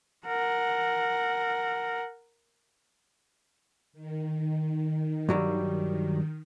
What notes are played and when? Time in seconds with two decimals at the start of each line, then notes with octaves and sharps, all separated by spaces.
0.26 A#4 F#5
3.93 D#3
5.29 G2 F#3 G3